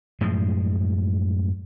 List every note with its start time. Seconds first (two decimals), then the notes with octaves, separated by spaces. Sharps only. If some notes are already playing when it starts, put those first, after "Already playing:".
0.21 F#2 A2 F3 G#3